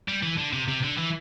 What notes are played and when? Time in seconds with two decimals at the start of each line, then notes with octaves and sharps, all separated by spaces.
0.08 G3
0.23 E3
0.38 D3
0.53 C3
0.68 C3
0.83 D3
0.98 E3